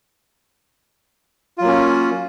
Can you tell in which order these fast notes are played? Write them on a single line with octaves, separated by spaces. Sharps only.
F4 F#3 A#3 C#4